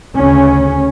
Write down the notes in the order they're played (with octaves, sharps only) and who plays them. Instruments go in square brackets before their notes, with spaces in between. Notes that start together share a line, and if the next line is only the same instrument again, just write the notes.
[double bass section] D2 C#3 C#4